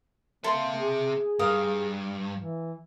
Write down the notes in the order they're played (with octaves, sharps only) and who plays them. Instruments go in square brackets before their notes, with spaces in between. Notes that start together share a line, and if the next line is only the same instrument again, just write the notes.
[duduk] A#3 [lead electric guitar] C4 E5 [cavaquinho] A4 C6
[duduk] G#4
[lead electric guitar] G2 [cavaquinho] A#4 F5 D#6
[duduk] E3